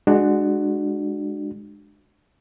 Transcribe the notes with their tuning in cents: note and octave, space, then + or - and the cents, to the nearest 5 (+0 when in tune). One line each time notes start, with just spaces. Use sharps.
G#3 +0 D4 +25 F#4 +0